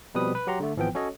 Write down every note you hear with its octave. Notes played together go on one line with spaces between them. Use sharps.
B2 F3 G3 C4 B4 D#6
B4
F#3 G4 F#5 A#5 C6
D3 A3
G#1 E3 F3 B3 G5
C#4 F#4 A4 C#5 D#5